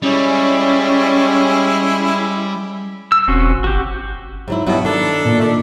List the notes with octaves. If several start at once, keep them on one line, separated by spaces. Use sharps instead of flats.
G3 G#3 C#4 E4
E6
E1 C4 C#4 F#4
F#1
G1 F#4 G4
G#2 F#3 E4
G2 B2 F#3 B3 E4
D#3 D4 A4
A#2
A3 D4